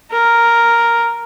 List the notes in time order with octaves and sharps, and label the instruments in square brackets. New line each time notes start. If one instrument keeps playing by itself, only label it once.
[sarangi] A#4